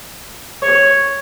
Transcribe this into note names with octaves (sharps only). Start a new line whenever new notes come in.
C#5